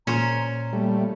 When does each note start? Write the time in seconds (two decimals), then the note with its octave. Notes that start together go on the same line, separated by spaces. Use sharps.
0.07 A#2 C#4 C5 A#5
0.73 G3 A3 A#3